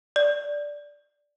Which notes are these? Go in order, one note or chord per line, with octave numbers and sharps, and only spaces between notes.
D5